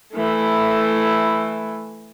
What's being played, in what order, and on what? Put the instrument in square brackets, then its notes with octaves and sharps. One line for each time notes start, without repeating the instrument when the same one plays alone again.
[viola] E3 A3